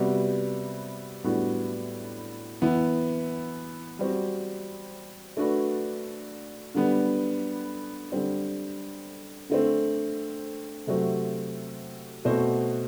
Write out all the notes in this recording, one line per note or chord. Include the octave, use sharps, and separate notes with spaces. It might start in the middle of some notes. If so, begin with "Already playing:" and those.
Already playing: C3 G3 B3 F#4
A2 G3 B3 D4 F#4
E3 B3 E4
G3 C4 F#4
A3 D4 F#4 B4
D3 G3 B3
D3 G3 C4
D3 A3 C4
C3 F#3 A3 C4 F#4
B2 A3 C4 F#4 C5